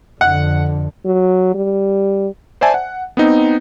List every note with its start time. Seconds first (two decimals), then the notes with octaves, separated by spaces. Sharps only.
0.21 F2 D3 F#5
1.06 F#3
1.55 G3
2.61 C5 D5 E5 G#5 A5
2.74 F#5
3.17 B3 C4 D#4